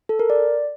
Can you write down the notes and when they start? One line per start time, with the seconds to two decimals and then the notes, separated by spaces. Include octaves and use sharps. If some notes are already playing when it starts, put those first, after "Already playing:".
0.09 A4
0.19 A#4
0.30 D5